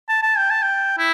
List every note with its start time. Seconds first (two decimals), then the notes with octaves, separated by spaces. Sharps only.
0.08 A5
0.23 A5
0.38 G5
0.50 A5
0.63 G5
0.98 E4